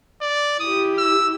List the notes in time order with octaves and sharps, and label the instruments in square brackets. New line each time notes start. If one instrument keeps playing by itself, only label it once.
[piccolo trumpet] D5
[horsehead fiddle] E4 G4 [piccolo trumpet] D#6
[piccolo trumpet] E6